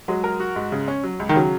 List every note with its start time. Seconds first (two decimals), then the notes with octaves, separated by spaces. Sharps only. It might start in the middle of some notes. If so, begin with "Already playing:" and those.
0.08 F#3 G#3
0.24 A#4
0.40 F#4
0.56 G#2
0.72 C#3
0.88 C#4
1.04 F#3
1.20 C#2
1.29 D#3
1.35 C#3 F#3